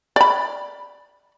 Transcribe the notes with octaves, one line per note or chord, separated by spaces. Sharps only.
D5 B5